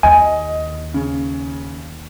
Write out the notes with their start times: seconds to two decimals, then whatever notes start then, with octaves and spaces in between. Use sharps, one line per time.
0.03 D#2 D#5 G#5
0.94 C#3